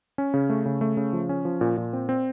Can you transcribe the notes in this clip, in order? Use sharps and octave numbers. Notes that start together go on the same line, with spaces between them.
C#4
C#3
A3
C#3
A3
C#3
F3
C#4
F3
A#2
A#2
C4
C4